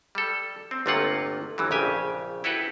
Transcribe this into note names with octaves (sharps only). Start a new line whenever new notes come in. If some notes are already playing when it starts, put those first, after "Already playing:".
G3 A4
C4
G1 C3 A3 A#3 F4 F#5
G1 E3 F#3
A#1 C#3 G4 G#5
E4 F#4 G4 A4 B4